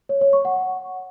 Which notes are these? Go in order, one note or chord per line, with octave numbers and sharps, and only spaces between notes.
C#5
C#5
C#6
F#5